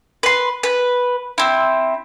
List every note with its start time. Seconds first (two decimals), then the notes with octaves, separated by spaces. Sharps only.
0.23 B4 C6
0.63 B4
1.38 C4 E4